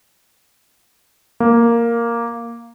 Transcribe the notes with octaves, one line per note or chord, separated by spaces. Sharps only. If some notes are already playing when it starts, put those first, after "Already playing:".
A#3